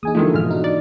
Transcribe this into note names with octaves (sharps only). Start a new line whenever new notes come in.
E3 A#3 D#4 G#4 G#5 D#6
D3 D#3 F3 G#3 A3 E4 F4 A4
G#2 B2 E3 F6
D4 D#4 F#4
D5